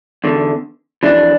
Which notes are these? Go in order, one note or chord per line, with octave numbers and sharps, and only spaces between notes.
E2 D3
F2 E3 D4